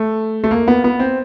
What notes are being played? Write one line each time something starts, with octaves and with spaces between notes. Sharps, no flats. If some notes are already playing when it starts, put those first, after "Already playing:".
Already playing: A3
A3
A#3
B3
B3
C4